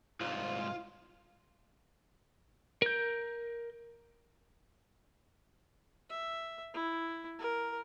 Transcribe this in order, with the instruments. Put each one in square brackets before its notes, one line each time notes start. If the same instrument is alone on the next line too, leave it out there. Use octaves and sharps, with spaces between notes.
[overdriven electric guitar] C2 G#2 [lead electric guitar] F4
[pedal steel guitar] A#4 G6
[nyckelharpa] E5
E4
A#4